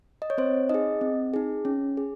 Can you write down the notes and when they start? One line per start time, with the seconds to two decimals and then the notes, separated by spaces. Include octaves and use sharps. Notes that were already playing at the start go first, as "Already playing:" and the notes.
0.22 D#5
0.30 C#5
0.38 C4 C5
0.69 D#4 G#4 D#5
1.01 C4
1.34 D#4 G#4
1.65 C#4
1.97 G#4